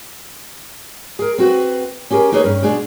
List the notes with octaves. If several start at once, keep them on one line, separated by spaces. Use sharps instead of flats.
G#4 A#4
C4 F#4 B4
C#4 G4 G#4 A#4
A#3 D#4 E4 G#4 B4 C#5
G2 C#4
B2 G#3 D4 G#4